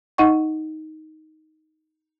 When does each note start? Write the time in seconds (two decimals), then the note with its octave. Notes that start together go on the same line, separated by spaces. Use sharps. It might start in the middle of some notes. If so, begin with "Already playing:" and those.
0.18 D#4 D#5 F#5 C#6